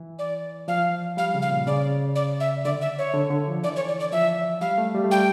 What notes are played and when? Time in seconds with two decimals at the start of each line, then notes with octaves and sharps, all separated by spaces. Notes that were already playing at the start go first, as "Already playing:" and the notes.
Already playing: E3
0.19 D5
0.68 F3 F5
1.17 G3 F5
1.34 C#3
1.42 F5
1.50 A#2
1.67 C#3 D5
2.15 D5
2.40 E5
2.65 D3 D5
2.81 E5
2.98 C#5
3.14 D3
3.30 D3
3.47 F3
3.63 E3 D5
3.76 C#5
3.88 D5
4.00 D5
4.12 F3 E5
4.61 G3 F5
4.78 A3
4.95 G3
5.04 A3
5.11 G3 G5